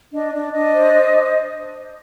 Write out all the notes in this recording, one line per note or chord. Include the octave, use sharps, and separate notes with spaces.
D4 D#5
D4 D5
D4 D#5
C5
C5